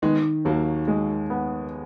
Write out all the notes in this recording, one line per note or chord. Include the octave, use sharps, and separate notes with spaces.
D#3 G#3 B3
D#2 F#3 A#3
G#3
B3